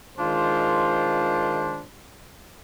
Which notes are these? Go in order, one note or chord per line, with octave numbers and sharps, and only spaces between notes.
D#3 G#3 D4 F4 C5